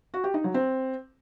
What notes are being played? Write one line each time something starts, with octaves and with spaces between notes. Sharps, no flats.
F#4
G4
D#4
F#3
C4